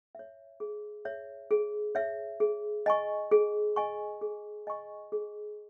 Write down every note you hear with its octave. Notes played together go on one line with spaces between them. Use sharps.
C#5 E5
G#4
C#5 E5
G#4
C#5 E5
G#4
D#5 G#5 C#6
G#4
D#5 G#5 C#6
G#4
D#5 G#5 C#6
G#4